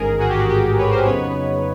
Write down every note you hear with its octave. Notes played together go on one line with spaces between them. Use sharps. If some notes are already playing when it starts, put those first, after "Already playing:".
Already playing: A1 G#2 D#3 G#4 A#4
F#4 G#4
G4
F#4
G4
B4 C#5
A#4 C5
F2 C#3 F#3 B3 D#4 B4 C#5